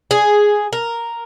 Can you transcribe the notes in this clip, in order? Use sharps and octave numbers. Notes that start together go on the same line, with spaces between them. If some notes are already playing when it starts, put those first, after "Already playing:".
G#4
A#4